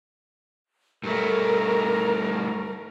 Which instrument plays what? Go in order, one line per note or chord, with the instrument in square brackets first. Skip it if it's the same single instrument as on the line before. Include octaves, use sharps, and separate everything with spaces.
[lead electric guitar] G2 A3 [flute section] A#4